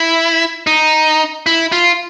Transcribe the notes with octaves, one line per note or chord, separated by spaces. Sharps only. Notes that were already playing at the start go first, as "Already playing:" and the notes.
Already playing: E4
D#4
E4
F4